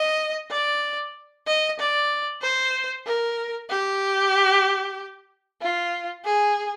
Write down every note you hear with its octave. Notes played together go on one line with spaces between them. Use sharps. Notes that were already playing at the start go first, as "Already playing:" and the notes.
Already playing: D#5
D5
D#5
D5
C5
A#4
G4
F4
G#4